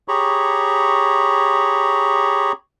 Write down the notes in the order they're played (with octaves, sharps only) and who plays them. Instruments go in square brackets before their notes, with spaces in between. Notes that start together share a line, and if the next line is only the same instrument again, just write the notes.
[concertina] G4 G#4 C#5 A#5 B5 C#6